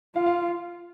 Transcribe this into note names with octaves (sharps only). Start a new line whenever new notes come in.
F4 F5
F5